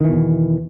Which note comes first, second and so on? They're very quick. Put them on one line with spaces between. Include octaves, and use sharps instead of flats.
D#3 E3 B2 E2